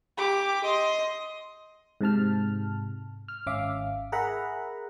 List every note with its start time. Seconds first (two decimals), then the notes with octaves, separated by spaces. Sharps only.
0.17 G4 D6
0.64 D#5 C6
2.01 G#2 C3 A5 F6
3.28 F6
3.47 G#1 C#4 E5 F5 D6
4.12 G#4 A#4 E5 F#5 A#5 B5